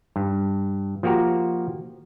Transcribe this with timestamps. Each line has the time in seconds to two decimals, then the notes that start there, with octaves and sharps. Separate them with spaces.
0.16 G2
1.03 F3 A#3 F#4 G4 A#5